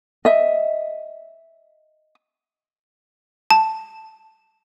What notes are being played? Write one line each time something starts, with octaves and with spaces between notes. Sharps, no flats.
D#5 E5
A5